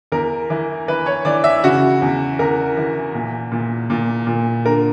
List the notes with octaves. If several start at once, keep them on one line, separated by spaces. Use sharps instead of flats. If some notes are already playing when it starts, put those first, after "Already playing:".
E2 A#4
E3
E3 B4
C#5
E3 D5
E5
C#3 F#4
E2
E2 A#4
E3
A#2
A#2
A#2
A#2
D3 A#4